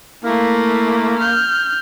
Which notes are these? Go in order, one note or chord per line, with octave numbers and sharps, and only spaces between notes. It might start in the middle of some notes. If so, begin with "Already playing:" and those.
A3 A#3 E4
F6 G6